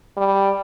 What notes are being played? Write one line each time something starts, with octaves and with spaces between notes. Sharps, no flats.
G3